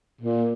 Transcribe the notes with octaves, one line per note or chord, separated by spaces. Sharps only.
A#2